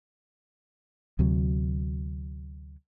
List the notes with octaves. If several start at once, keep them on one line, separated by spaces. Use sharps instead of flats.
D2 C3 F#3